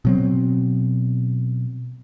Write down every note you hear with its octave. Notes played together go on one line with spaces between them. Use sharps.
B2 F#3 C4